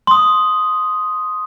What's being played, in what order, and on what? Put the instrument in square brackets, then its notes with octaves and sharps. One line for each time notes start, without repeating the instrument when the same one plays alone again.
[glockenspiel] C6 D#6